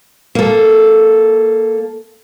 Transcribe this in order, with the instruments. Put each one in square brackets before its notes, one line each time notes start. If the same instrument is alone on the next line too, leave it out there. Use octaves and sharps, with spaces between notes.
[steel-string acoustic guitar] A#3 A4